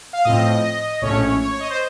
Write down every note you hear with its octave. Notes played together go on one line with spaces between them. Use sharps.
F5
A2 F3 C4 D#5
A#1 A2 A3 C#4 C#5
C#5
C#5
D#5
C5